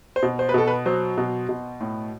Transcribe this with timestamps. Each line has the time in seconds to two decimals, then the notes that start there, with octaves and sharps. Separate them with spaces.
0.16 C5
0.23 B2
0.39 C5
0.49 B4
0.54 B2 A4
0.67 B4
0.86 F#3 C5
1.18 B2
1.49 B2
1.81 A2